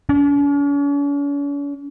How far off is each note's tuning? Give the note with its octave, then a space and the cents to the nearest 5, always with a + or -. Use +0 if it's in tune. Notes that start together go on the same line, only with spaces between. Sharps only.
C#4 +45